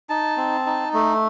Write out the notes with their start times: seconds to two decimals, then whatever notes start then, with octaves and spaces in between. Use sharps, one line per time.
0.10 D#4 A5
0.37 C4
0.66 D#4
0.94 A3